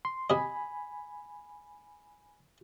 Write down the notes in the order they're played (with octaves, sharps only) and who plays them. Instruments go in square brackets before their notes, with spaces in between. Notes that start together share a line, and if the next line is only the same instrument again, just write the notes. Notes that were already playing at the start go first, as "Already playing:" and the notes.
[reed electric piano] C6
[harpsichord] C3 D#5 [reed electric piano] G#5 B5